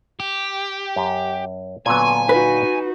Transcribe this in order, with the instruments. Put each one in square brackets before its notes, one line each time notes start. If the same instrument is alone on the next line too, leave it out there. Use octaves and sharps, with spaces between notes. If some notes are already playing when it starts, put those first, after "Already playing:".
[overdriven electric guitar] G4
[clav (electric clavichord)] F#2
[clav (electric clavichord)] A#2 D3 F#3 [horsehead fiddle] B3 [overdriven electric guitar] G#5
[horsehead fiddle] D#4 F#4 [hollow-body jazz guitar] B4